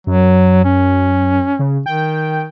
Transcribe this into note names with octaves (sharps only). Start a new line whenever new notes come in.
F#2 F#3
C#4
C#3
D#3 G5